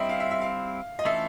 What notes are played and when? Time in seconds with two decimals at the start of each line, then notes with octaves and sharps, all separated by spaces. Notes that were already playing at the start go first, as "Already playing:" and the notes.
Already playing: G3 C4 E4 D#5 E5
0.09 F5
0.20 E5
0.31 E5
0.42 F5
0.99 D#5
1.05 E3 A3 C#4 F4 A4 E5